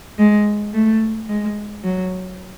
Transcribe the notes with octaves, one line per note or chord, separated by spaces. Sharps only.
G#3
A3
G#3
F#3